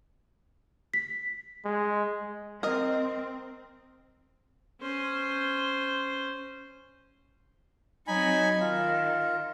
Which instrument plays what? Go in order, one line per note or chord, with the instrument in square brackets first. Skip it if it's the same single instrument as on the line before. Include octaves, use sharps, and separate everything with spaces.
[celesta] B6
[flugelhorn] G#3
[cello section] C4 [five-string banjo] A#4 D#5
[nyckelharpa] C#4 C5
[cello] F#3 C4 [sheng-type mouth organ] D#4 G#5 B5
[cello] D#3 [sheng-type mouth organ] F4